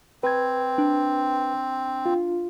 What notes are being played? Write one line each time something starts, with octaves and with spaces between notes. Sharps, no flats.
C4 B4 G#6
D4
F4